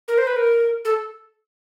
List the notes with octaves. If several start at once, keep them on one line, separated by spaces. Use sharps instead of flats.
A#4
C5
B4
A#4
A4